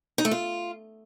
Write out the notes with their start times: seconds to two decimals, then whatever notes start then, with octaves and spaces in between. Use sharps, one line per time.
0.18 D#4
0.25 A3
0.31 F4